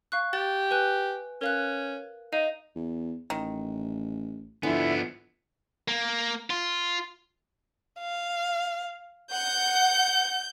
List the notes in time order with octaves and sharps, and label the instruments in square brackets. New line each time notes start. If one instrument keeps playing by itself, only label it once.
[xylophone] F5 C#6 F#6
[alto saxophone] G4 [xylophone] A6
[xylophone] B4 G#5 F#6
[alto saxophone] C#4 [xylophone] A#4 F5 F#6
[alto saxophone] D#4 [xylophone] D#5 F5 D#7
[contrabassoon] E2
[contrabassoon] A1 [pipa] D#3
[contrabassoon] D3 [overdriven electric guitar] F3 B3 [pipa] G#3 [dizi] E4
[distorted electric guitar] A#3
F4
[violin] F5
[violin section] F#5 [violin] G6